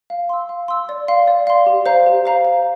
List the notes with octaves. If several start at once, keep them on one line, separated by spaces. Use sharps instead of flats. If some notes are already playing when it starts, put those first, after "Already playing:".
F5
C6 E6
F5
C6 E6
D5
F5 C6
D5
F5 C6
G4
C5 F5 A#5
G4
C5 F5 A#5
F5